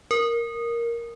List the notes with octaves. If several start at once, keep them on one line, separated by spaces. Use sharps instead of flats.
A#4